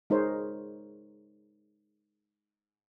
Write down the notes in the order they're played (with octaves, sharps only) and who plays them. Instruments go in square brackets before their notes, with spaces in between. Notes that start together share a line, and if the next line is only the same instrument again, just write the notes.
[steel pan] G#3 D#4 A#4 C5 C#5